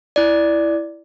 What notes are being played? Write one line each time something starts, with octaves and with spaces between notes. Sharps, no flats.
E4 D5